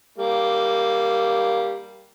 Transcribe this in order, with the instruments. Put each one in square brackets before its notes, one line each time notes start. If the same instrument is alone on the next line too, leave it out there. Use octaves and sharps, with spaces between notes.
[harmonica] G3 A#3